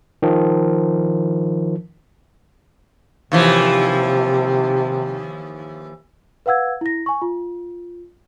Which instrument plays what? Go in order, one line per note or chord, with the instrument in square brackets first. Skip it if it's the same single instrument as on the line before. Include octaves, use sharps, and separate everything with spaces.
[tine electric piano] D#3 F3
[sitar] D#2 E3 F3 [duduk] C3
[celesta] B4 F5 F#5 E6 G#6
E4 A#6
G#5 C#6
F4